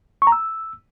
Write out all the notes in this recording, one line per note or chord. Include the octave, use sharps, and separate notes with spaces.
C#6
A#5
E6